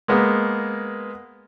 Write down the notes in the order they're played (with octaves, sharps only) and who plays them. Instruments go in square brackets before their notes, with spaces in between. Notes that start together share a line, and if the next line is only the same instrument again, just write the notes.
[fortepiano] G#3 A#3 B3